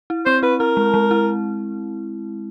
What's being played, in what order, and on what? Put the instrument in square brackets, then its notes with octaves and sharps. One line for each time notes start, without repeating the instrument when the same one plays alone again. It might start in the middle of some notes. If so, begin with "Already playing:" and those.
[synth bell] E4
[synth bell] C4 [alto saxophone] C5
[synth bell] E4 [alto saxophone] B4
[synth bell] E4 [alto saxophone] A#4
[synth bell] G#3
G#3
E4